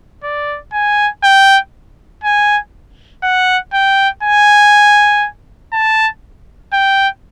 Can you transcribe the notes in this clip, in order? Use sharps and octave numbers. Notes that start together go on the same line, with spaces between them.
D5
G#5
G5
G#5
F#5
G5
G#5
A5
G5